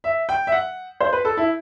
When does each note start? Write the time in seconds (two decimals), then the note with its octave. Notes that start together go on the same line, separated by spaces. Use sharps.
0.04 E5
0.29 G5
0.47 E5
0.52 F#5
1.00 C5
1.13 B4
1.25 A4
1.37 E4